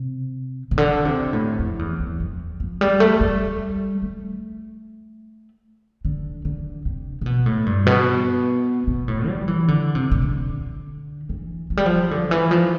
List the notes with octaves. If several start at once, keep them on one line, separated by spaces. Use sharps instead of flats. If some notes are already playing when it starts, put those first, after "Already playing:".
Already playing: C3
C3
D3
C3
A2
F2
E2
E2
F2
F3
G3
A3
G3
A3
D3
D3
C3
C3
B2
A2
G2
B2
B2
A2
G3
E3
D3
C3
C3
D3
E3
F3
G3
F3
D3
E3
F3